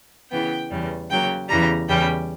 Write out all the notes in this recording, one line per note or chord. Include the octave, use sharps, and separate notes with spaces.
C#3 E3 B3 G5
E2 C#3 G3
C#3 F#3 A#3 G5
E2 C#3 E3 G3 A#5
E2 C#3 G3 G5